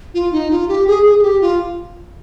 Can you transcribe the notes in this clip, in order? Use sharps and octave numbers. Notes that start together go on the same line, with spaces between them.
F4
D#4
F4
G4
G#4
G#4
G#4
G4
F4